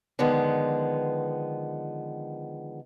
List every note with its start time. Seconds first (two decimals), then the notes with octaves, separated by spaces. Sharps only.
0.19 D3 D#3 F3 G#3 B3